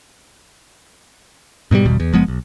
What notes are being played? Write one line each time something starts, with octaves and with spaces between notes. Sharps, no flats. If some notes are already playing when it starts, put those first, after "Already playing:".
G#2 B2 E3 G3
G#1 E2 B2 G3
E2
F#1 F3 G#3 B3
B1